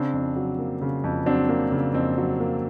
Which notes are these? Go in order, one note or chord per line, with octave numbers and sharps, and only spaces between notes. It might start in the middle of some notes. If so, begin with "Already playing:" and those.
Already playing: C#3 C4 D4
F2
F#3
A#3
C#3
F2
F#3 C4 D4
A#3
C#3
F2 C4
F#3
A#3